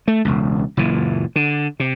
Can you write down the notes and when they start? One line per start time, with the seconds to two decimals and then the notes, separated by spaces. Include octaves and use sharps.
0.08 A3
0.25 E1 C#2
0.77 F#1 A#2 E3
1.36 D3
1.80 C3